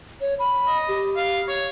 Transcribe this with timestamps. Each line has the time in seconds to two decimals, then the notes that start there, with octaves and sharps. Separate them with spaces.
0.21 C#5
0.39 B5
0.67 D#5
0.89 G4
1.16 F5
1.48 C#5